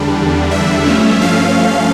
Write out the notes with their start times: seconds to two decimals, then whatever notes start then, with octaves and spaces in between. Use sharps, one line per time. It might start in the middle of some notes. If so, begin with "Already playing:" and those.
Already playing: E2 D3 G3 D4
0.51 E5
0.85 G2 F3 A3 C#4
1.22 F5